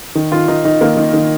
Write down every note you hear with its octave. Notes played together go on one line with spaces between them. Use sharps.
D#3
D#3 F4
D#3 D#4
D#3 D#4
D#3 A#3
D#3
D#3